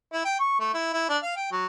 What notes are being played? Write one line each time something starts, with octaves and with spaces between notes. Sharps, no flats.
E4
G5
C#6
A3
E4
E4
D4
F5
G5
F#3